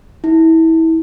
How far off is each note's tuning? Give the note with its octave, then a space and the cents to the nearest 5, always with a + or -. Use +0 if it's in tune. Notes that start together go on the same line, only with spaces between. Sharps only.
E4 -25